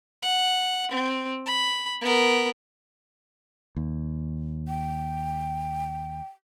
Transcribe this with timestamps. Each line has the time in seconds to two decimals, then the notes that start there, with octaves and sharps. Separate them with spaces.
0.22 F#5
0.91 C4
1.46 B5
2.01 B3 A#4
3.76 D#2
4.68 G5